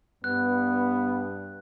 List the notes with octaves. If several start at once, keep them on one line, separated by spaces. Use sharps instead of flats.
G2 B3 F#6